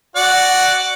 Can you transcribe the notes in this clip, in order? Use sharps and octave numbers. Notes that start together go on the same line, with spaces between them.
F#4 D5 F#5